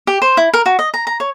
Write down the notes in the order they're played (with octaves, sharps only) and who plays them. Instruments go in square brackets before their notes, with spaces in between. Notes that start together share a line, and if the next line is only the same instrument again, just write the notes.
[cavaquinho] G4
C5
E4
A#4
F#4
D#5
A#5
A#5
C#5